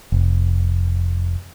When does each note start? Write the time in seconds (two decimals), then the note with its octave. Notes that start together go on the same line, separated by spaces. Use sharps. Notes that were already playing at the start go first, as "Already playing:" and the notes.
0.12 F1